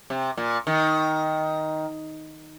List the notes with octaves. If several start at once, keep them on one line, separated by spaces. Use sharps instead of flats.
C3
A#2
D#3